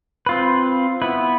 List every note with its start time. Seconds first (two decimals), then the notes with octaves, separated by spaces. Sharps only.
0.26 C4 F4 B4
1.02 B3 E4 B4